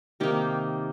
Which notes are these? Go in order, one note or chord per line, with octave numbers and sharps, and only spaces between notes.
C3 D#3 A#3 D#4 G4 A#4